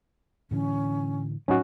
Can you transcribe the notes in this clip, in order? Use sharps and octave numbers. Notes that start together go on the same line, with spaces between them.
A2 D3 E3 C#4
A2 F#3 C#4 D#4 F#4